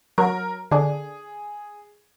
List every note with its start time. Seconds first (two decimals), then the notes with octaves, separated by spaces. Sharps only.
0.18 F#3 A#4
0.71 D3 D4 G#4